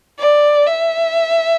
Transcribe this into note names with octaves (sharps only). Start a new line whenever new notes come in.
D5
E5